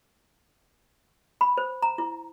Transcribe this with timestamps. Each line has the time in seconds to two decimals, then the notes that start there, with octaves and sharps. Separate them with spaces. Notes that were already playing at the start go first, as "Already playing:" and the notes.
1.41 B5
1.57 C5
1.82 A#5
1.98 E4